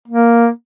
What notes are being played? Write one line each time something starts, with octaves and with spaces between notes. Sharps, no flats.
A#3